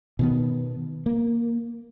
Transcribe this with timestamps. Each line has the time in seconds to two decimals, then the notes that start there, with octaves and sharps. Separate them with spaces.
0.19 B2 D#3 B3
1.06 A#3